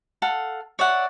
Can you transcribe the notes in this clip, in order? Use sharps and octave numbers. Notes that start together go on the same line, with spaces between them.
A4 F5 F#5
C#5 D5 E5 F#5